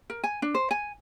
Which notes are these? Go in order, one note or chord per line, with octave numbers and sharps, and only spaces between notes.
A#4
G#5
D4
C5
G#5